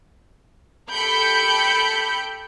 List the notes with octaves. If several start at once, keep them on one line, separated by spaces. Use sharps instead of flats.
G4 A4 B5 G6 C#7 D7